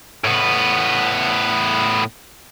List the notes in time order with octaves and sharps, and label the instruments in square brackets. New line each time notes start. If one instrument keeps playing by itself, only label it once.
[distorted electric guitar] A2 B3